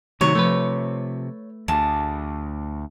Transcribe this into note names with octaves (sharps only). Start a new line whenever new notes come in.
C3 D#3 F#3 A3 C#5
F3 A3 B4
D2 G#4 A5